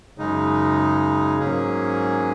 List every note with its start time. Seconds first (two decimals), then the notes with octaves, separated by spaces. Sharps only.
0.18 F#2 C#3 G#3 D#4
1.38 G#2 F#3 A#3 C#4 G#4